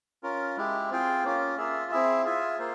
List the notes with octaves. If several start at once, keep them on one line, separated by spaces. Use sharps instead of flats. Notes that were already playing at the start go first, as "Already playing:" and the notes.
C#4 F4 A#4
G#3 E4 G4
C4 F4 G#4 C5 G5
A#3 C#4 F4
A#3 F4 G#4 E5
C4 E4 G#4 E5
F4 G#4 E5 G#5
A#3 F4 C5